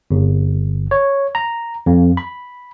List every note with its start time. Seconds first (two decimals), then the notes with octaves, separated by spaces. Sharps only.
0.11 G1
0.91 C#5
1.35 A#5
1.86 F2
2.17 B5